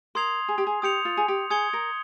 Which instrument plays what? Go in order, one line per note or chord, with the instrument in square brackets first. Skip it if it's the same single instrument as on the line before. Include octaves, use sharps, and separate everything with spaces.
[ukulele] A#4 [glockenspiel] C6 D#6 G#6 C7 F7
[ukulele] G#4
G4
G#4
[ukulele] G4 [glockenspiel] D#6 G6 C#7 F7
[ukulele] F4
G#4
G4
[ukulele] G#4 [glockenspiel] D#6 G#6 C#7 G7
[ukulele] A#4